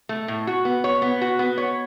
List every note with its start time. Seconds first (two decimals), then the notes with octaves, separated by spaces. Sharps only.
0.09 A3
0.28 A2
0.47 F#4
0.65 B3
0.84 C#5
1.02 B3
1.21 F#4
1.39 B3
1.58 C#5